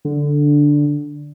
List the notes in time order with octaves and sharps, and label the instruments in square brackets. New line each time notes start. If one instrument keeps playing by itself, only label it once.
[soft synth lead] D3